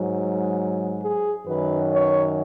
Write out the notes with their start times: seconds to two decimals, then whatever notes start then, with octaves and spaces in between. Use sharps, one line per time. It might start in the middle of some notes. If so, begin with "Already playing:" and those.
Already playing: G#2 F#3
1.02 G#4
1.47 F#2 D#3 F#3 B4
1.92 C#5